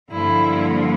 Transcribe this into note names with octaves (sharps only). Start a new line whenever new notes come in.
G2 D3 F3 A#3 E4